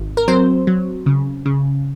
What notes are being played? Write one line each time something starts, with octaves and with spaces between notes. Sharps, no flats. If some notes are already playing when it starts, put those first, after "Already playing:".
Already playing: G#1
A#4
F#3 C4 C5
F#3
C#3
C#3